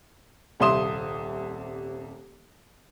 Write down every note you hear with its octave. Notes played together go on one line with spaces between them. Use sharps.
D#1 C2 E5 C6 D#6 E7